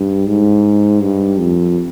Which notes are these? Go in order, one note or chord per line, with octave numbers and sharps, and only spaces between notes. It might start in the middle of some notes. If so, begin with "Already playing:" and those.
Already playing: G2
G#2
G2
F2